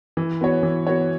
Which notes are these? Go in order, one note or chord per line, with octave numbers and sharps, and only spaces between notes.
E3
B3 F#4 C#5
E3
B3 F#4 C#5